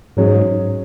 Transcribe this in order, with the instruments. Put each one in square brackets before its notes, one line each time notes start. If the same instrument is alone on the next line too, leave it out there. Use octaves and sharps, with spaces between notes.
[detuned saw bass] G#2 [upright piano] F#3 C#4 G#4